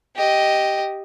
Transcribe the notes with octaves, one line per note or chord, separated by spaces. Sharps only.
G4 D#5